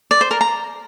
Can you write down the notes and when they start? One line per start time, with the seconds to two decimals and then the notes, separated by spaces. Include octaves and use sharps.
0.11 D5
0.21 C5
0.31 A#4
0.41 A#5